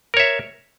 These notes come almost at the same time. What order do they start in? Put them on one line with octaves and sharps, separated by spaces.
A#4 C#5 E5